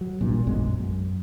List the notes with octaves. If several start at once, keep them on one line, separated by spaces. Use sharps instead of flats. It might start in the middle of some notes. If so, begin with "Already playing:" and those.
F#3
A1 G2 A#2
A#1 F#2 G#3 B3
F#2